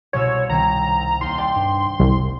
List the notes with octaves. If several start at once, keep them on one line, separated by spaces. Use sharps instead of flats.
C2 B2 C#5 E6
C2 D#3 C4 A#5
D#2 C6
D5 G5
G2
F1 C2